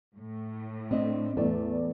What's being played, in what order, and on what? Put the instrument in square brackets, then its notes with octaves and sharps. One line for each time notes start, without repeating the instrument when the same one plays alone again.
[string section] A2
[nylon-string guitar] C4 D4 D#5
[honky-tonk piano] E2 D5 [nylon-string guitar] A3